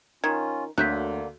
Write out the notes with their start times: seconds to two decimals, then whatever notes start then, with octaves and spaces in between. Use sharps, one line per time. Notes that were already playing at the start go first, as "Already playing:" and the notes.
0.24 D#3 C#4 F4 G#6
0.78 D2 D3 F#3 A#3 F#6 G6 B6